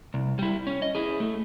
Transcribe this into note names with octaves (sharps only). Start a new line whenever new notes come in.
C2
G3 E4
C#4
D#5
E4 G#4
A3